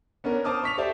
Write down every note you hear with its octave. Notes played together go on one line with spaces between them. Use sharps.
B3 C#4 D4 A#4
C5 A5 D6 D#6 F6
C#6 B6 F7
G4 A4 C5 D5 E5